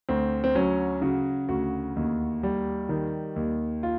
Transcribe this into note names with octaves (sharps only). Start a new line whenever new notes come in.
D2 C4
C4
F#3 C#4
C#3 F#4
D2 F#4
D#2
G3
D#3
D#2
F4